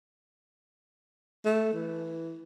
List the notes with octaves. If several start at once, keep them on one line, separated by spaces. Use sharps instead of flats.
A3
E3